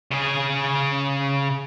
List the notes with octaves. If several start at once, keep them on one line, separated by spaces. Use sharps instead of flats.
C#3 G#4